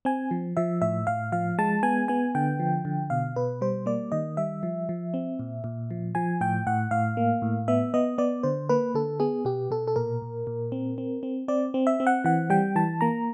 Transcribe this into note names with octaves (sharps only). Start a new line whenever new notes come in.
C4 G#5
F3
F3 E5
A2 E5
A2 F5
F3 F5
G#3 A5
B3 G#5
B3 G#5
D3 G5
F3
D3
B2 F5
B2 B4
G3 C5
A#3 D5
D#3 D#5
G3 E5
F3
F3
C4
A#2
A#2
F3
F3 G#5
A2 G5
A2 F#5
A2 F5
A#3
A2
B3 E5
B3 D#5
B3 D5
D3 C5
A#3 B4
D3 A4
B3 G#4
B2 G4
B2 A4
A4
A#2 A#4
A#2
A#2
C4
C4
C4
C4 D5
C4
E5
C4
F#5
E3 F#5
G3 G5
E3 A5
A#3 A#5